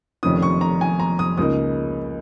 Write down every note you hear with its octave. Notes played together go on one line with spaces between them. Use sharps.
F1 F2 D#3 C#4 D#6
C#6
A#5
G#5
A#5
D#6
C#2 C#3 A#3 D#4 D#6